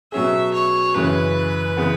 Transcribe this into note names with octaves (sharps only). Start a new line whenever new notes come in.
B2 F#3 C#4 G#4 E5
C#5
F#2 C#3 E3 G#3 C#4 B4
C#3 E3 B3